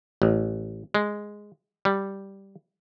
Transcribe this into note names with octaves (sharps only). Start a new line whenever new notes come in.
A1
G#3
G3